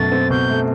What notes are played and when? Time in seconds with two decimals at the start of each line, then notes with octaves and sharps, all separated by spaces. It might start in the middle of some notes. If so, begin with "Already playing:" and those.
Already playing: F#2 B2 A3 A6
0.12 C4
0.30 B2 G6
0.49 A3